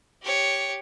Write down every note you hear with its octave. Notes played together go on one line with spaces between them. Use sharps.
G4 C#5